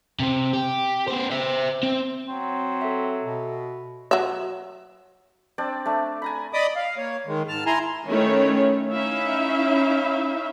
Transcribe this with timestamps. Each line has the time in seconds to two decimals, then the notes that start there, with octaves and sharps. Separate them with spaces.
0.20 C3 C4
0.53 G4
1.08 B3 C5
1.31 C5 E5
1.83 C4
2.27 F#3 C4
2.81 A4 E5
3.23 B2
4.11 F#3 E5
5.58 C4 D4 D5
5.86 A3 D4
6.22 G#5 A#5 B5
6.53 D5 D#5 B5 D6 D#6
6.76 F5
6.97 A#3 C#5
7.26 D#3 G#3
7.48 G#2 A5 F6
7.66 E4 G#5 A#5 C6
8.08 D#3 A3 C#4 E4 C#5
8.90 C#4 D#4 E4 E5 F5